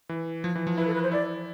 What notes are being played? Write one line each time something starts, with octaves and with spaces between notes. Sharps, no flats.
E3
F3
E3
F3
E4 B4
A4
B4
C5
E4 D5